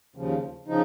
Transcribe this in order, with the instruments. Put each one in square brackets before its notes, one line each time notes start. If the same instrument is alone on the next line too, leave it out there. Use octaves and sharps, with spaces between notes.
[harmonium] D#2 C#3 F3
C#3 F3 D#4